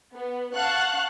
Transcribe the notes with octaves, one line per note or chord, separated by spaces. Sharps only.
B3
F5 F#5 A5 C#6 F#6